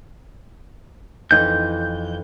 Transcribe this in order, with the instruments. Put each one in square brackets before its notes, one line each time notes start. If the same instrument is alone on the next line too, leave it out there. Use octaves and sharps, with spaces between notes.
[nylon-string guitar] F2 E3 D#4 [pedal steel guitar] G6